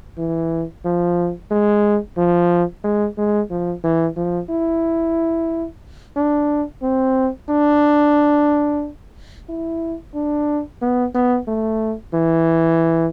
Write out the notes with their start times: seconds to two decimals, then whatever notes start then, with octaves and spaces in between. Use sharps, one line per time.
0.18 E3
0.85 F3
1.51 G#3
2.17 F3
2.84 G#3
3.18 G#3
3.50 F3
3.84 E3
4.17 F3
4.50 E4
6.16 D4
6.82 C4
7.49 D4
9.49 E4
10.15 D4
10.82 B3
11.15 B3
11.48 A3
12.14 E3